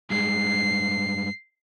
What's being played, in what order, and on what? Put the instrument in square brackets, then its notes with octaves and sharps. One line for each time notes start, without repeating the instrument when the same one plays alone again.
[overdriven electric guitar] G2 G#3 [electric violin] C7